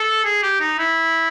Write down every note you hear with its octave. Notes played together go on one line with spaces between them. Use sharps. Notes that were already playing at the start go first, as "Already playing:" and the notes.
Already playing: A4
G#4
G4
D#4
E4